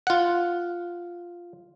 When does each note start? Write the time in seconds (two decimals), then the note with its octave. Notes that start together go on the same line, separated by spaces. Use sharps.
0.07 F4 F#5